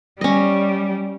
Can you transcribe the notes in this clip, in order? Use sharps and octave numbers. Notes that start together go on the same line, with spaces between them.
G3 C#4 D#5